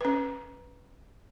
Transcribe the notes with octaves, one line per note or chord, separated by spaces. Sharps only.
C#4 B4